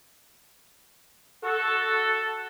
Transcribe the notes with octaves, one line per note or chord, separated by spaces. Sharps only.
F#4 A4